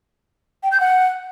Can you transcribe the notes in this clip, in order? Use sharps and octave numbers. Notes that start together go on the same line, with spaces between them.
G5
G6
F#5